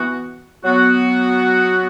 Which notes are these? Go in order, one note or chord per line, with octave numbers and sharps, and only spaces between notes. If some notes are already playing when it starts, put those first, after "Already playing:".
Already playing: E3 B3 F#4
F#3 B3 F#4